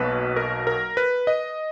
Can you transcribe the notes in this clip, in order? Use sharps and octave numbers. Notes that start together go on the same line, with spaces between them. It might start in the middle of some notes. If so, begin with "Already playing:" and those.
Already playing: B1 B2 F#3 A#3 B4
A#4
A#4
B4
D#5